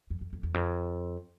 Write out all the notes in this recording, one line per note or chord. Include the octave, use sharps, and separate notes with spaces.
F2
F2
F2
E2
F2